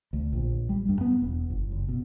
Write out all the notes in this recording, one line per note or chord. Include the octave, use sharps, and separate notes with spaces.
D2
A#1
G3
G2
B3
E1
G1
F#1
B2